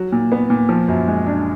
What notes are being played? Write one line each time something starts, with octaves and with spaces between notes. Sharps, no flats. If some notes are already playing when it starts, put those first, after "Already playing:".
Already playing: F#3
A#2
B3
A#2
F3
F#2
G#3
D4